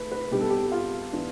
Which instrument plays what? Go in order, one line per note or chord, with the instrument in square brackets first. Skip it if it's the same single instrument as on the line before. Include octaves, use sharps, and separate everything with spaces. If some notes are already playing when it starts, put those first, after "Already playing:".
Already playing: [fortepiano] A3 B4
B4
B2 G3 D4 G4
A4
G4
F4
E3 B3 D4